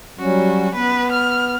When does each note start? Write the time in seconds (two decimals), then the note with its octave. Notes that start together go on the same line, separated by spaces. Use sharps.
0.19 F#3 G3 C#4 F#4
0.74 B3 B4
1.11 F6